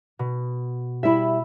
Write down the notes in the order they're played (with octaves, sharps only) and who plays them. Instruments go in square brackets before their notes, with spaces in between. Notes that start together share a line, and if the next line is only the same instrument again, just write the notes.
[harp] B2
[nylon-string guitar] G3 E4 [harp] E5 B5